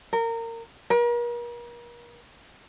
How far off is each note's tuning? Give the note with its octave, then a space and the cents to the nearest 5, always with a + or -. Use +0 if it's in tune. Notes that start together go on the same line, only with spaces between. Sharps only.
A#4 -25
A#4 +40